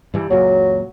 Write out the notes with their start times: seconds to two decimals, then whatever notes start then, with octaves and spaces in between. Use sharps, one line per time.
0.14 G2 E3 G3
0.30 C#2 F#2 A#2 F#3